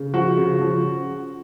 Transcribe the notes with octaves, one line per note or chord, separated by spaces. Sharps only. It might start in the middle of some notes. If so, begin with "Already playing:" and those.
Already playing: C#3
F3 F#4
C#3
F3